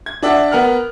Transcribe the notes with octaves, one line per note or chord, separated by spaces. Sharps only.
G#6
D4 D5 E5 F#5 A5
B3 A#4 F#5 F6